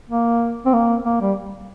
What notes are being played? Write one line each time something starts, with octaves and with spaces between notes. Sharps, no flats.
A#3
C4
A#3
A#3
G3